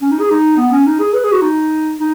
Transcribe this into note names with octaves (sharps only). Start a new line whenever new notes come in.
C#4
D#4
G#4
D#4
B3
C#4
D#4
G#4
B4
G#4
F#4
D#4
D#4